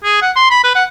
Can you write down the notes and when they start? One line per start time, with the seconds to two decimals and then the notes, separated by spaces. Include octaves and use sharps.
0.04 G#4
0.22 F#5
0.36 C6
0.50 B5
0.64 B4
0.76 F#5